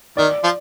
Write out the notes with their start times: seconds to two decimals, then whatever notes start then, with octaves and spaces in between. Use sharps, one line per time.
0.17 D#3 D5
0.43 F3